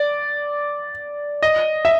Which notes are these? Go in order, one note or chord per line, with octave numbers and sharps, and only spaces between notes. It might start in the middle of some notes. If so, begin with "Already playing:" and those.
Already playing: D5
D#5
E5